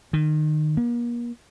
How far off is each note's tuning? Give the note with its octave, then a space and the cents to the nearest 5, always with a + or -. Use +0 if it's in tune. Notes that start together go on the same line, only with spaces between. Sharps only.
D#3 -25
A#3 +40